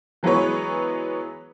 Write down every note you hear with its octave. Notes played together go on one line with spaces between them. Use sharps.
E3 F#3 G#3 B3 B4 C#5